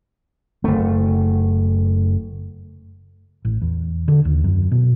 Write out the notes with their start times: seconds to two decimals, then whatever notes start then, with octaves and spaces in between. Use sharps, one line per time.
0.64 F#1 A3
3.45 A1
3.62 E2
4.08 D3
4.25 D#2
4.44 F#2
4.71 B2